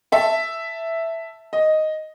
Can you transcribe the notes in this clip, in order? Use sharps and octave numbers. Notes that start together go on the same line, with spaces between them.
E5 A5
D#5